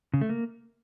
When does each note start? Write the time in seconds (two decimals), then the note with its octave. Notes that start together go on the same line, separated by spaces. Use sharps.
0.14 C#3
0.21 A3
0.29 A#3